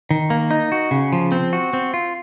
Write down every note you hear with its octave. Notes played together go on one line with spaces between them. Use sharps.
D#3
A#3
D#4
F#4
C#3
F3
C4
F#4
C4
F4